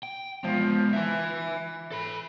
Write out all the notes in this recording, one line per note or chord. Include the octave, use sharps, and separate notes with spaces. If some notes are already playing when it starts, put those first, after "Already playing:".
G5
F3 G#3 B3
E3 E5 G#5
A4 B5